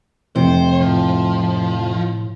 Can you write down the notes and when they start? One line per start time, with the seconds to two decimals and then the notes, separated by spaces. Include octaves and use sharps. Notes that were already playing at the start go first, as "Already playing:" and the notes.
0.36 F1 C3 C5
0.81 A2 F3